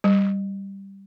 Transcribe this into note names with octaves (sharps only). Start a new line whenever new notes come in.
G3